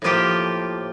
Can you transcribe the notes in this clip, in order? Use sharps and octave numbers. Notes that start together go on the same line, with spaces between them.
A2 F3 A#3 F4 G4